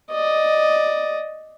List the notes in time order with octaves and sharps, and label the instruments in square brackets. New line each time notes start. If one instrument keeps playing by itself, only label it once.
[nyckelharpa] D5 D#5